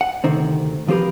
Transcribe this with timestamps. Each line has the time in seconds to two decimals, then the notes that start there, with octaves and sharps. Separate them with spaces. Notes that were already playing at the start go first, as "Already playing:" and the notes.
0.01 F#5
0.24 D2 C3 D#3 C4
0.88 F3 C4 G4 A#4 B4